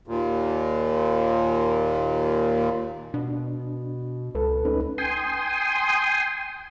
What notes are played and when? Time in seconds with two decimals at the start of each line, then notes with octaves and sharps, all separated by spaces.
0.07 D#2 A#2
3.14 B2 D4
4.35 C#2 A4 B4
4.65 D2 C#4 D#4 B4
4.98 G5 G#5 C6 D#6